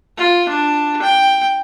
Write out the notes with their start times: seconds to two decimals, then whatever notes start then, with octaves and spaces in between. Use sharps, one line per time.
0.17 F4
0.49 D4
1.02 G5